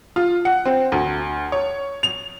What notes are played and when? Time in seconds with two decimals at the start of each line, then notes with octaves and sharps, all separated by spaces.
0.16 F4
0.45 F#5
0.66 C4
0.92 D2
1.52 C#5
2.03 F7